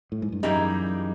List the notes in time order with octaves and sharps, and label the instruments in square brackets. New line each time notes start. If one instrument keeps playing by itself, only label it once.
[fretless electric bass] A2
G#2
G2
[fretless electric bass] F#2 [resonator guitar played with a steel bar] E3 G3 A#3 D#4 G#4